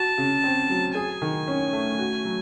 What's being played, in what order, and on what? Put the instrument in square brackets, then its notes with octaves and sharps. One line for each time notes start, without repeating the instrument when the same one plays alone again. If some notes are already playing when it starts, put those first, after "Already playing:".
Already playing: [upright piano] F#4 [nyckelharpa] A5
[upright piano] C#3
C4
F#3
[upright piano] G#4 [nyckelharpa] G#5
[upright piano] D#3
C#4
A3
F#4
F#3